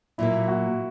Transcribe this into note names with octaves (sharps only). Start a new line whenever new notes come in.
A#2 F#3 A#3 E4
F#4